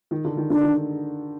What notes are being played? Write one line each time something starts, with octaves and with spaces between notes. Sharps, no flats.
D#3
D3
D#3
D3 D4
D#3